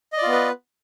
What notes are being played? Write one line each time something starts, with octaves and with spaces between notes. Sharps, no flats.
B3 F4 B4 D5 D#5